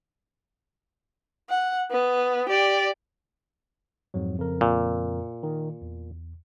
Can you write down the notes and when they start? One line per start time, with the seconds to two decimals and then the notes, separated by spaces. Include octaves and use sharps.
1.49 F#5
1.91 B3
2.49 G4 D5
4.14 F2 G#2 F#3
4.38 F2 C#3 A#4
4.61 A#2
5.43 D#3
5.82 E2